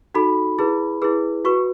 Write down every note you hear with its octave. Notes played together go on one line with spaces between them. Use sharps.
D#4 F#4 A4 B5
E4 G#4 B4
E4 G#4 B4
F#4 B4 C#6